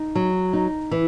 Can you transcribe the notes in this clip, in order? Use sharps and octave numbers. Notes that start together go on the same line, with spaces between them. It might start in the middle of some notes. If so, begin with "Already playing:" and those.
Already playing: D#4
F#3
D#4
E3